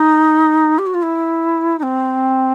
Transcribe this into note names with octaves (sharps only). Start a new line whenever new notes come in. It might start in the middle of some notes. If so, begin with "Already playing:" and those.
Already playing: D#4
G4
F#4
F4
E4
D#4
C4